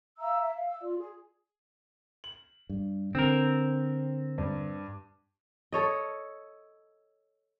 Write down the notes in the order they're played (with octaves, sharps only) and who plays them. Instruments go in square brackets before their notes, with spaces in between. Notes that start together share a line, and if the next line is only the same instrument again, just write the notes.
[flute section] E5 F5 A#5 E6
E5
F5
E6
F4 D5
G#4
[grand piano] F#7
[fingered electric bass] G2
[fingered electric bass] D3 [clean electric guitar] C4 A#4
[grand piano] G2
[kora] A4 C#5 D#5